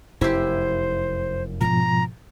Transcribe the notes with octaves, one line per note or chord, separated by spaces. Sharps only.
F1 F#2 E4 G4 C5
G#2 B2 F3 A#5